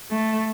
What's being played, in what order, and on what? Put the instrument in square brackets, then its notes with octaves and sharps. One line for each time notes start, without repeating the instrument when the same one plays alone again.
[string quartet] A3